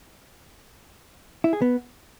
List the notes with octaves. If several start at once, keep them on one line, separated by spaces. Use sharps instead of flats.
E4
G#4
B3